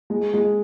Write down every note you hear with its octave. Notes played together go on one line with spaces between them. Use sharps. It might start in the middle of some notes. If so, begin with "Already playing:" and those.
G#3
G#3